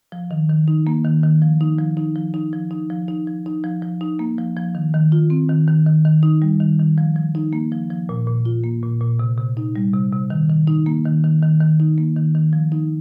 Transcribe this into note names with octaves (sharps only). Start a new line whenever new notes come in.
F3
D#3
D#3
D#4
A#3
D#3
D#3
F3
D#4
F3
D#4
F3
D#4
F3
D#4
F3
D#4
F3
D#4
F3
F3
D#4
A#3
F3
F3
D#3
D#3
F4
C4
D#3
D#3
D#3
D#3
D#4
G3
D#3
D#3
F3
F3
D#4
A#3
F3
F3
A#2
A#2
F4
A#3
A#2
A#2
C3
C3
D#4
G3
C3
C3
D#3
D#3
D#4
A#3
D#3
D#3
D#3
D#3
D#4
A#3
D#3
D#3
F3
D#4